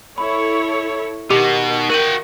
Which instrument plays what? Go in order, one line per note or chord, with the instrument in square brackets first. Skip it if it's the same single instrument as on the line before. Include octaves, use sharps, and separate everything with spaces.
[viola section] E4 A4 C#5 [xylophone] B5
[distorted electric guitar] B2 [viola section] D#3 [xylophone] G4 D6 F7
[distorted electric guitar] F#4 G5 [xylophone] A#4 D#7 F#7